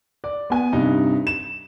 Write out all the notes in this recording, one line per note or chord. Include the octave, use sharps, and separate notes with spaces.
D5
B3 G#5
G2 C3 D#4
E7